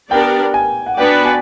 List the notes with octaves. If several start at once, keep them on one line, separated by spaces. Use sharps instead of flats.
B3 D4 G4 A#4 D5 G5
G#5
F#5
B3 D4 F#4 B4 D5 G5
G#5